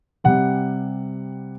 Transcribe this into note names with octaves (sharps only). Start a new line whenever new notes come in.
C3 G3 F#5